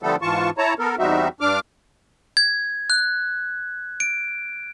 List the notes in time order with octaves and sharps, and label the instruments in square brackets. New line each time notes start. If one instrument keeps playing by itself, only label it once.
[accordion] D3 F3 G3 A3 B3 A4
G#2 E3 F4 A5 C#6
E4 C#5 A5 A#5
B3 A4 A#4
E2 G3 C4 D#4 F#4 E5
G2 D4 D6 F6
[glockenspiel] G#6
F#6
D7